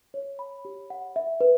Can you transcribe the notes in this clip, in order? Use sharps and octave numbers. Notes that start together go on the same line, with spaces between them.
C#5
B5
G4
F#5
E5
B4